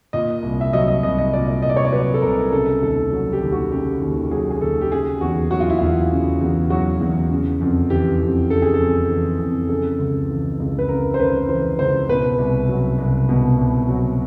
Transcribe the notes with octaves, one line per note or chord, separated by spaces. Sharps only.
A#2 D#5
C2
E5
F#3 D#5
D#5
C2 D#5
D#5
A#2 D5
C2 D#5
D5
C#5
D5
F#3 B4
A4
C2 A#4
C#3 A4
D#2 A4
F#3
G4
D#2
F#4
C#3 G4
D#2
F#3 G#4
G#4
D#2 A4
G4
C#3 G#4
E2 F#4
F#3 F#4
F4
E4
E2 F4
C#3
E2
F#3 F#4
E2
C#3
F2
E3 G4
F2
C#3 A4
G#4
A4
F2
E3
F2
C#3 A4
C#2
E3
C#2
B4
C#3 A#4
C5
C#2 B4
E3 C5
C#2 C5
B2 B4
C2
F#3
C2
B2
C2
F#3